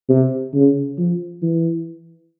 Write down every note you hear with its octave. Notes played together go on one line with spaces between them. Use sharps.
C3
C#3
F3
E3